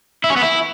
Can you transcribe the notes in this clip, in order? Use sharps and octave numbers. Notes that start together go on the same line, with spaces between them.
E4
C#4
B3
E4